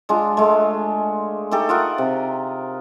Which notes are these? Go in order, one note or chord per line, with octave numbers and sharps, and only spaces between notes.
G#3 D4 F4
G#3 A3
A3 D#4 G4 A4
F4 A#4 D#5 F#5
C3